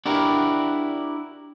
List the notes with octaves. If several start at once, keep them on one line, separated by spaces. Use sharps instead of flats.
D4 E4 F#4 G4 A#4